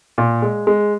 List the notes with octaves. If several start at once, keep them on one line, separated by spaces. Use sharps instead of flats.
A#2
G#3
G#3